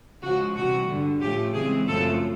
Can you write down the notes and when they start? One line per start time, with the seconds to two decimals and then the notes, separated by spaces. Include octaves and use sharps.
0.22 C#3 F3 G#3 F#4
0.55 C3 E3 G3 F#4
0.88 G2 D3 G3
1.21 A2 F3 A3 C#4 G4
1.54 C#3 E3 G#3 C4 G#4
1.87 F#2 C#3 F3 A3 C4 A4